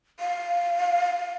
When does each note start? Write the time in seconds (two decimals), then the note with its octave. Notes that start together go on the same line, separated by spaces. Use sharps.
0.20 F5